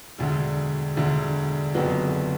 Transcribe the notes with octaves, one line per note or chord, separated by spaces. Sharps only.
E1 D2 D3
E1 D2 D3
F#1 F2 D3 F#3 B3